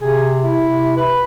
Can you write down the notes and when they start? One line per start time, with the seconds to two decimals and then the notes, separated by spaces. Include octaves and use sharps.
0.01 C3 G#4
0.44 E4
0.66 C3
0.97 B4